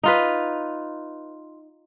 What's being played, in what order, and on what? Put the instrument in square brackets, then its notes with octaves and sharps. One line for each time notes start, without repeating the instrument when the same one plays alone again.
[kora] D#4 F4 B4